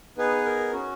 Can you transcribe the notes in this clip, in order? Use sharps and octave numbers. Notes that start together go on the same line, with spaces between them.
B3 D#4 G#4 B4
A#4
C#4 F#4